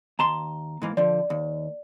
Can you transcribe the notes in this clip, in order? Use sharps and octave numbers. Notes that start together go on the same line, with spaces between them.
D#2 A5 A#5 C6
G#2 E3 A#3
D3 F3 D5
D#2